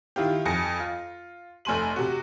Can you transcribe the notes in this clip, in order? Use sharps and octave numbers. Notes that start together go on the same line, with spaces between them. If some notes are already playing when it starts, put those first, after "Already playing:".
D#3 E4 F4 G4
F2 G#5 A#6 C#7
F4
F1 A3 G#5 C6 D#7 F#7
C3 F#4